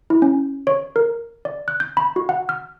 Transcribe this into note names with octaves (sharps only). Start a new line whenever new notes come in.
E4
C#4
C#5
A#4
D5
F#6
G6
B5
F#4
F#5
F6